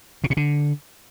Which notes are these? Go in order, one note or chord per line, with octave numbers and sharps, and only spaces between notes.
B2
A#2
D3